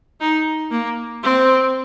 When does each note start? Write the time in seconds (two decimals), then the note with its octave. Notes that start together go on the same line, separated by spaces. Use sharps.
0.21 D#4
0.71 A#3
1.23 C4